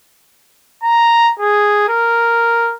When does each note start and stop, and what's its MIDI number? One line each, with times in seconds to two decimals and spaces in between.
0.83 1.32 82
1.40 1.84 68
1.89 2.74 70